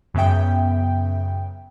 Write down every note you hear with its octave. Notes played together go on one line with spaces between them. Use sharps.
F#2 C#3 B3 E5 G5